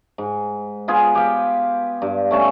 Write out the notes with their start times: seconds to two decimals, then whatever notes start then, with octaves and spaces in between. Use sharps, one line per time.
0.18 G#2
0.88 B3 F4 G#4
1.15 G4 B4 F5 G5
2.02 G2
2.31 A3 C#4 A5